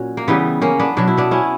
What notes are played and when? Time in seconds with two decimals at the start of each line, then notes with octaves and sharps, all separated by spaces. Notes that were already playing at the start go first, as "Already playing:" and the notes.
Already playing: A#2 F#3 C#4 F#4
0.17 A#3
0.28 C#3 E3 G3 B3
0.62 A#3 C#4
0.80 B3 D4
0.97 B2 F#3 D4
1.08 E4
1.17 B3 D4
1.31 C#4 E4